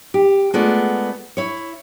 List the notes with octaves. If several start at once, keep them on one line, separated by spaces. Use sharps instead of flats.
G4
G#3 A3 B3 F4 D5
E4 C#5